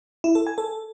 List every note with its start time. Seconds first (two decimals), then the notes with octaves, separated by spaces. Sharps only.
0.24 E4
0.35 A4
0.47 G#5
0.58 A4